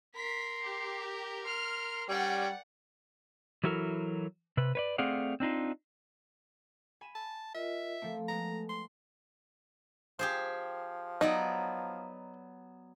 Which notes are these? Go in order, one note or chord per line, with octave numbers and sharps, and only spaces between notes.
A#4 C6 B6
G4
C6 F6
G3 C#4 D5 F#5 G5
E3 F#3 E4 F#4 A4 A#4
C3 B4
B4 C#5 D5
A3 C4 G#4 D5 F5 F#5
C4 D4 D#4 F4
G#5 B5 E7
A5
F4 A#4 D#5 E5
F3 A3 A#3 C4 A4
G#3 B3 A#5
C6
F3 G4 G#4 C5
F#3 B3 D#4 D5